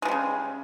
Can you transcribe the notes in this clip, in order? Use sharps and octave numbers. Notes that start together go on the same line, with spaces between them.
C#3 F3 G3 G#3